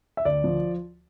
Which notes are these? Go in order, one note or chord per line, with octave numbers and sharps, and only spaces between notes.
E5
D2 D5
F3